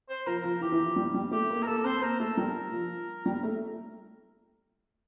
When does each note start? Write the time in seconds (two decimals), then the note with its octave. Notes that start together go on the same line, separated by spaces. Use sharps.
0.09 C5
0.27 F3 A#4
0.44 F3
0.61 E3 G4
0.72 E3
0.80 F3
0.96 G3
1.14 G3
1.31 A3 G4
1.50 A#3
1.62 A#4
1.67 A#3 A4
1.84 C4 C5
2.02 A#3 A#4
2.20 A3 A4
2.37 G3 A#4
2.72 F3
3.26 G3
3.43 A3